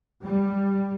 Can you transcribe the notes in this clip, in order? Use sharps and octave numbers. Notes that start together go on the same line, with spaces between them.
G3